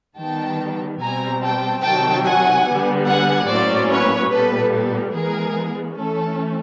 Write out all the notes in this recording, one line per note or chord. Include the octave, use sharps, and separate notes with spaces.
D#3 G3 B3 G5 A5
B2 G3 C4 G#5 A#5
G5 A5
C3 D#3 F#3 G5 A5
F#5 G#5
D3 G3 B3
F#5 G#5
A2 F#3 A#3 C#4 C5 D5
B4 C#5
A#2 G3 B3 A4 B4
A4
E3 G#3 B3 G#4 A#4
E3 A3 C#4 A4